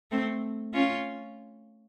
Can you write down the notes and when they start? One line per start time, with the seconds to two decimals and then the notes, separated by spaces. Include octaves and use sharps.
0.11 A3 C4
0.74 C#4 F4